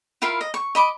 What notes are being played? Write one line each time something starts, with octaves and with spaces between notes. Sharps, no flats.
E4 F4 A#4 F5
D#5
C#6
D#5 B5 D6